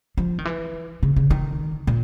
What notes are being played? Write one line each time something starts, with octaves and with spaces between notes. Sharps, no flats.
F3
D#3
E3
C#3
C#3
D#3
A#2